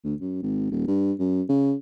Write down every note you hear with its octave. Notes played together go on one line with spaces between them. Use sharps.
D2
F#2
G#1
D#1
G2
F#2
C#3